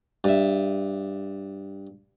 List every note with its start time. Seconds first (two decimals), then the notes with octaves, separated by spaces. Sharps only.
0.24 G2 E5